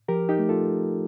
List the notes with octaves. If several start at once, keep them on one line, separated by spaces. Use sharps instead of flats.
F3 G4 A#4
D#4 G4
A3
F4 A4